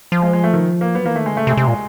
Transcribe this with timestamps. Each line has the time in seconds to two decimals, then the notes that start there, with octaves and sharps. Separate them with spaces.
0.12 F3
0.22 G#3
0.33 G#3
0.44 A3
0.53 D#3
0.81 A#3
0.95 F#3 B3
1.05 E3 A#3
1.16 D#3 A3
1.26 D3 G#3
1.36 C#3 A3
1.47 C3
1.51 G#3
1.57 C3
1.64 A#2 G#3